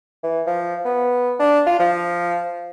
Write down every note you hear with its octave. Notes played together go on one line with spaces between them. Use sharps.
E3
F3
B3
D4
F4
F3